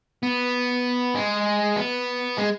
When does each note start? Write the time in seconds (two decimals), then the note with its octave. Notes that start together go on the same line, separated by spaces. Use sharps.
0.23 B3
1.15 G#3
1.76 B3
2.38 G#3